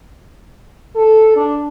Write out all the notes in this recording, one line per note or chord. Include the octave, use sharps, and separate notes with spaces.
A4
D4